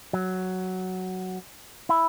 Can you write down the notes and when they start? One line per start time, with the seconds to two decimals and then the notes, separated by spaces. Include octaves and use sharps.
0.13 F#3
1.89 E4